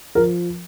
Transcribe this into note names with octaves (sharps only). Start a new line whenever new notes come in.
F3 A#4